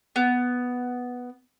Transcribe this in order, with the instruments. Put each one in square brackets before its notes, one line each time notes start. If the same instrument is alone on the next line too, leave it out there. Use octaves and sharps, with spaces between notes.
[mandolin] B3